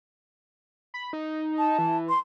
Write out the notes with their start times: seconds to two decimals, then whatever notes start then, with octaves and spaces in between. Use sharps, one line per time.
0.94 B5
1.13 D#4
1.58 A5
1.79 E3
2.09 C6